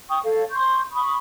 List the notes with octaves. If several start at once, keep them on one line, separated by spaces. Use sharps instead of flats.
G5 C#6 D#6
A4 C#5 F5
C6 C#6 G6
B5 C#6 D#6